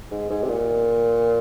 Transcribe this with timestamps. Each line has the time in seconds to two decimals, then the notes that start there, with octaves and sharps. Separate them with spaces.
0.12 G#2
0.30 G#2
0.43 C3
0.49 A#2